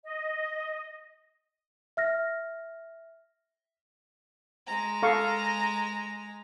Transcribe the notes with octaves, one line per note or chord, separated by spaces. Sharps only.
D#5
E5 F6 A#6
G#3 A#5
A4 F5 C#6